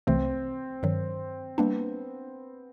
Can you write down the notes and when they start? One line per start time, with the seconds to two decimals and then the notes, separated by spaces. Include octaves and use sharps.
0.07 C2 C3 E3 A3 C4
0.83 G2 D#3 F#3
1.58 G3 A#3 B3 D4